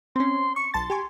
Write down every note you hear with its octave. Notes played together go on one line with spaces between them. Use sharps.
C4 C#4 C6
C#6 C#7
B1 A5 C6 A6
G4 G#5 C#6